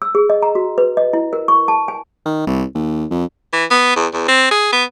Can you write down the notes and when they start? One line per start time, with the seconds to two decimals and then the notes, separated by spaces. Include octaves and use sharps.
0.02 E6
0.15 G#4
0.30 D#5
0.42 A#5
0.55 F#4
0.78 B4
0.97 D#5
1.13 E4
1.33 A#4
1.48 C#6
1.68 A5
1.88 G#5
2.26 D#3
2.47 C2
2.75 D#2
3.11 F2
3.53 E3
3.71 B3
3.96 E2
4.13 E2
4.28 C4
4.51 G#4
4.73 B3